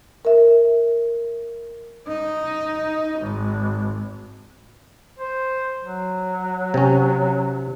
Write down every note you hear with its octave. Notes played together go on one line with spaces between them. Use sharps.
A#4 E5
D#4
G#1
C5
F#3
C3 C#4